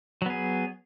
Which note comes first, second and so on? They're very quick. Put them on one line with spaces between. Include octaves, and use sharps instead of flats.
F#3 B3 G#4